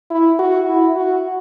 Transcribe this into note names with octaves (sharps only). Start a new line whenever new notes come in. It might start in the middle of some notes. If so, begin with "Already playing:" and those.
E4
F#4
E4
F#4